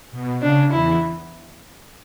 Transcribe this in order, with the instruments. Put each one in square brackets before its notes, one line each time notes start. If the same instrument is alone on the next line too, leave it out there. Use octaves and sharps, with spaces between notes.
[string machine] B2
[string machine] C#3 [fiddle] D4
[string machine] E2 E3 [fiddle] E4